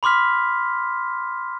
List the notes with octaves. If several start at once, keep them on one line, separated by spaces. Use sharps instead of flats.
B5 C6 D6 F6 B6